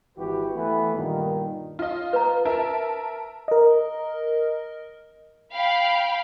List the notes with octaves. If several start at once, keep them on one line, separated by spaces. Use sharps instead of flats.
G#1 E3 F#4 G4 B4
E3 A3 B3 B4
G2 A#2 D#3
F4 D#5
B4 A#5
A#4 E5 A5
A#4 D#5
F5 G5 B5